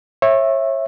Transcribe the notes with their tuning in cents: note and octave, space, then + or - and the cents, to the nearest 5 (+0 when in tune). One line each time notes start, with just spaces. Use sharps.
C#5 -30 E5 +0